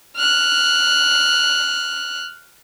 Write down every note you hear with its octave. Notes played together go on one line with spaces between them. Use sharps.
F6 F#6